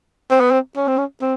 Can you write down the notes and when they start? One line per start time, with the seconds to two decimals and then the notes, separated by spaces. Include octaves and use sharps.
0.31 C4
0.40 B3
0.51 C4
0.76 C#4
0.87 C4
0.98 C#4
1.21 C4